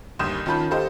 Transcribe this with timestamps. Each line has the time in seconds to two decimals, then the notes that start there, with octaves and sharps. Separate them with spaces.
0.19 G1 D#2 C6 D#6 G6 E7
0.46 D#3 C#4 F4 A5 B5 G6
0.71 G4 A4 C5 D#5 F5